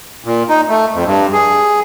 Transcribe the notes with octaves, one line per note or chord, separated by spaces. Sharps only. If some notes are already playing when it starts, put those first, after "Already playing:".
A#2
D#4
A3
F2
G2
G#4